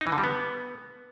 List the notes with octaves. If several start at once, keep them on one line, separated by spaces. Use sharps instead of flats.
D#4
E3
D3
G3
B3